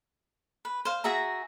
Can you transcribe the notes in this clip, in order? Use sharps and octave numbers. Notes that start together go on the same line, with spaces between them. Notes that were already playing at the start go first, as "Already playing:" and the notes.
B4
C5 F5
F#4 G#4 E5 A#5